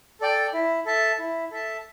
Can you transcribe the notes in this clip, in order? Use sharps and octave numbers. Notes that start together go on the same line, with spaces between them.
A4 D5 G5
E4
A4 E5 A5
E4
A4 E5 A5